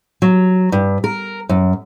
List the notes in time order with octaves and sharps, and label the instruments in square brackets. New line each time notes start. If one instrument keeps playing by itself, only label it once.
[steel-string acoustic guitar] F#3
G2
A#4
F#2